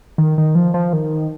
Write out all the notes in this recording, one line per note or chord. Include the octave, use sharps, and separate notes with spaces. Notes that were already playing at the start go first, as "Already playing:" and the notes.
D#3
D#3
F3
F3
D#3